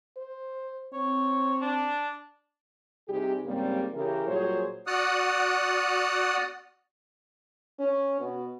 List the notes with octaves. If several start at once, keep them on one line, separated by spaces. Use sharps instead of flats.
C5
C4 C#5
D4
C3 G3 D#4 G4 G#4
G#2 C#3 G3 A#3 C4 G4
C#3 E3 G4 A#4
A#2 F#3 G3 G#4 C5 C#5
F#4 D5 F#5 D#6 F6 F#6
C#4
B2